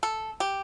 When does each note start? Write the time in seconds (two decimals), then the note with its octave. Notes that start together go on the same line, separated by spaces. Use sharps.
0.03 A4
0.40 G4